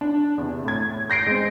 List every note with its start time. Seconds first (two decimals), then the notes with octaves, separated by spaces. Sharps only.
0.01 D4
0.38 E2 C3
0.65 A2 G#6
1.10 G6 A#6 C7 D7
1.27 G#3 C4